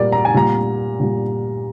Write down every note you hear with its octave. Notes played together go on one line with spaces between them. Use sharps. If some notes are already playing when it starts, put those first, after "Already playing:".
Already playing: A#2 G3 A#4 D5
A#5
G#5
A#2 G3 A#5
A#2 G3